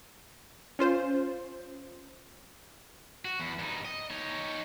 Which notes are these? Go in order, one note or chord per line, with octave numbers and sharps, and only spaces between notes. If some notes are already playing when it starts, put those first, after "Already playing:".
C#4 F4 C5
F#4
E2
G2 D#4
D#5
D#4 C#5